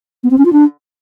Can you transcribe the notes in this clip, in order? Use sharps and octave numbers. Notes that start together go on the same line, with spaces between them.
B3
C4
C#4
F4
D4